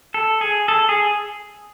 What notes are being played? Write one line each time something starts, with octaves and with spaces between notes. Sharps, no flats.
A4
G#4
A4
G#4